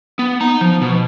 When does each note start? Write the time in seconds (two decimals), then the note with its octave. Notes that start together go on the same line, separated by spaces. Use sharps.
0.19 B3
0.41 D#4 A#5
0.61 F3
0.81 B2